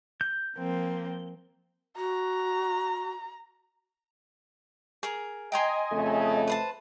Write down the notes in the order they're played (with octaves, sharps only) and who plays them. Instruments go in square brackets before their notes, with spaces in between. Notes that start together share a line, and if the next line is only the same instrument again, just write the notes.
[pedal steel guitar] G6
[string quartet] F3 A#3 C4
[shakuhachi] F#4 [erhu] A#5
[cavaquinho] G#4 A#4
[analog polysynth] D#5 G#5 [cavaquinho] G5 A#5 C6
[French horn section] F2 C#3 A3
[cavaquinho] B4 C5 A5